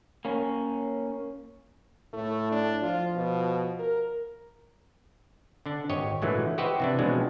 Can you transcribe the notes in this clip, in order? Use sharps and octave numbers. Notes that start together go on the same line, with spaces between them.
A#3 C#4
A2 A3
D4
F3 F4
B2
A#4
D3 D4
G#1 G4 C#5 D#5
A#2 D3 E3 F#3 G#3 A3
F#4 G4 B4 C5 D#5 E5
C3 E3 D4
B2 F3 F#3 G#3 C4 D4